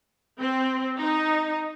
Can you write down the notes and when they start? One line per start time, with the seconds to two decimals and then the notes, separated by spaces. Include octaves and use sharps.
0.40 C4
0.99 D#4